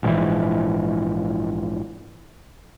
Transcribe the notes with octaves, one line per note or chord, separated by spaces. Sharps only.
A#1 G#2 D3 E3